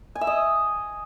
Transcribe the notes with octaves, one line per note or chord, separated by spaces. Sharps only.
G#5
E5
D#5